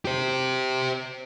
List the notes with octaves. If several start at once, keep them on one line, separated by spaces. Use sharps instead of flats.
G4 C5